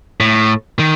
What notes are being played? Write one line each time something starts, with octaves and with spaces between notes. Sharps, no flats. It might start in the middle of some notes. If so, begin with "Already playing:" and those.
A2
D#3